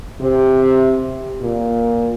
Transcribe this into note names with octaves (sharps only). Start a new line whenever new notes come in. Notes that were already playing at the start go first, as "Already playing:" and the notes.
C3
A#2